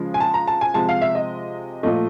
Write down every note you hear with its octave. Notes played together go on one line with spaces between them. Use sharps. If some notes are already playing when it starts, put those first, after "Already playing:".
Already playing: C#3 F3 G#3
G#5
A5
A#5
A5
G#5
C3 F3 G#3 A5
F5
E5
D#5
A#2 F3 A3 D#5